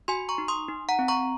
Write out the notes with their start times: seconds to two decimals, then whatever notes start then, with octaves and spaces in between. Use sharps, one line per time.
0.08 F#4 G#5 C6
0.29 A#5 C#6
0.38 D#4
0.48 C6 D#6
0.68 D#4
0.89 F#5 A#5
0.99 C4
1.08 A#5 C#6